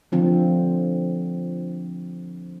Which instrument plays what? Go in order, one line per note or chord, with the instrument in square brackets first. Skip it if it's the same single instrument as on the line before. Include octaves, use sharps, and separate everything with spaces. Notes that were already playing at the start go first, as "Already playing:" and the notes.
[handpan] D3 F3 C4